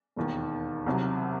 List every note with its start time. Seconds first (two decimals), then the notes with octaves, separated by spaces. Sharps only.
0.16 E1 D#2 D#3
0.86 C2 C3 F#3